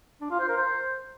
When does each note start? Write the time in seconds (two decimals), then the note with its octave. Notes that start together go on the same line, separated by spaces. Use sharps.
0.21 D4
0.30 F4
0.39 C5
0.48 A#4
0.57 C5